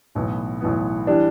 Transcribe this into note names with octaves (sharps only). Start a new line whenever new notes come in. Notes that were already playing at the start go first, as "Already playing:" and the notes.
B1 A2 E3 B3
B1 A2 E3 B3
E3 G3 D4